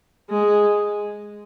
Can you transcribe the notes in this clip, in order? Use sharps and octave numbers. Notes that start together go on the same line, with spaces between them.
G#3